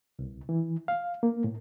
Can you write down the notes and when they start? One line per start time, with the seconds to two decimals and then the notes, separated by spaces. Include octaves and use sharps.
0.19 C2
0.49 E3
0.88 F5
1.23 A#3
1.44 A2